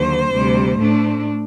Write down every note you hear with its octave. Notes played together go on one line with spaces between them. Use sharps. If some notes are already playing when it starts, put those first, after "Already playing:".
Already playing: D#2 D3 F#3 C5
D2 C3 G3
A2 A3 D4